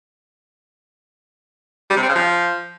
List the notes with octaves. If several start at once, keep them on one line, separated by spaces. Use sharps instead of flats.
G3
C3
C4
C#3
F3